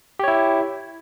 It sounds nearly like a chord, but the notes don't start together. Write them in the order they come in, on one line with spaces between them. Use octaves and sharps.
G4 C#5 E4